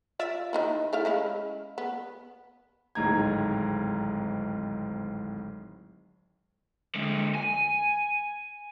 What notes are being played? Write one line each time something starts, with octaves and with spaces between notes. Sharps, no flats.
F4 D5 E5
E3 D#4 E4
A3 E4 F5
G#3 C#4 E4
B3
D1 G#1 G#2 A#5 G#6
D3 G#3
G#5